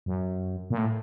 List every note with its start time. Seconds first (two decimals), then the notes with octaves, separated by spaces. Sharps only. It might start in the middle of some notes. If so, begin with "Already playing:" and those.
0.06 F#2
0.70 A#2
0.78 A2